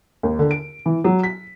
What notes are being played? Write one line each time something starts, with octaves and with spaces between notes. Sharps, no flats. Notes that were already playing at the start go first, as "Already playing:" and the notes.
D#2
D3
D7
E3
F#3
B6